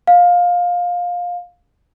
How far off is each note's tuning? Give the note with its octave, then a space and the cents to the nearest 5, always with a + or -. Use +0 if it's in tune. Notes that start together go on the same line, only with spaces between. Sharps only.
F5 +20